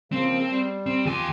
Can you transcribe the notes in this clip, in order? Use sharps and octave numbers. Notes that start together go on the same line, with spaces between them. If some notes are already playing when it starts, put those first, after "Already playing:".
C#3 F3 A#3 C4
G3
C4
D#2 F4 G4 G#4 G#5